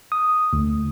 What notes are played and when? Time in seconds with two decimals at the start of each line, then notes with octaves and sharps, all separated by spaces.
0.12 D#6
0.53 D2